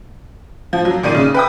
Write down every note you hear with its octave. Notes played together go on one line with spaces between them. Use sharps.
F3
F#3
A#2 D#3 D5 D#7
C#3
B4 G5 D#6